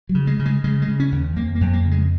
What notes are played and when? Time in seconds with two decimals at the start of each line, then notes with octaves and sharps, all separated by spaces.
0.09 F#3
0.15 C#3
0.27 G#3
0.39 C#3
0.46 G#3
0.64 C#3 G#3
0.82 G#3
0.88 C#3
1.00 C#4
1.12 D#2
1.36 F2 A#3
1.55 A#3
1.61 F2
1.73 A#3
1.85 C#3
1.91 G#3